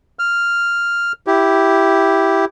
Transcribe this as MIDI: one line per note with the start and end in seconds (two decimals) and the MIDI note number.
0.19 1.12 89
1.27 2.45 64
1.27 2.45 67